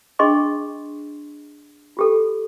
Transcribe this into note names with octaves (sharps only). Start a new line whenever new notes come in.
D4 G#4 D#5 C6 C#6
F4 G4 A4